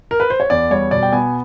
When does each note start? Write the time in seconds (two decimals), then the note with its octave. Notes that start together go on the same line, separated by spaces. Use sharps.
0.11 A#4
0.20 B4
0.30 C5
0.40 C#5
0.50 E2 D5
0.70 G3 C#5
0.91 B2 D5
1.03 G5
1.13 B3 G#5